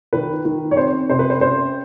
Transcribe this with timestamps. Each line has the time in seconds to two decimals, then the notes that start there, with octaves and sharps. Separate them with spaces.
0.13 D#3 B4
0.45 D#3
0.71 C#5
0.77 C4 C5
1.10 C3 C5
1.19 B4
1.30 C5
1.41 C#4 C5